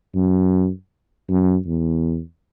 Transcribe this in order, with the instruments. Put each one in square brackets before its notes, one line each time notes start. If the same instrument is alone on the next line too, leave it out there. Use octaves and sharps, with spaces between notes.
[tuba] F#2
F#2
E2